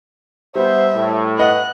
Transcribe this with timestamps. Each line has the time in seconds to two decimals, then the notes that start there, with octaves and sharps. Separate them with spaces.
0.55 G3 B3 C5 E5
0.94 A2
1.39 B4 D#5 F#5 F#6